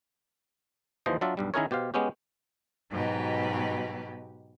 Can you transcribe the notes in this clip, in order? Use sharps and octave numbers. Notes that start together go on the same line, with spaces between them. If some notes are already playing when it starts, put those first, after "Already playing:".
D#2 E3 F3 C5 D#5
F#3 D4 F4 D5 E5
B1 G2 G3
D#3 C#4 E4 G#4 A#4 C#5
B2 G4 C5 F5
G#3 B3 C#4 G4
G#2 B2 F#3 G4 B4